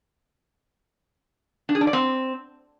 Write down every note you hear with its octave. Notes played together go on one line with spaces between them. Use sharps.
D4
G#4
D4
D5
C4